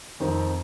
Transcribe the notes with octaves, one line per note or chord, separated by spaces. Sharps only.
F2 D#3 C4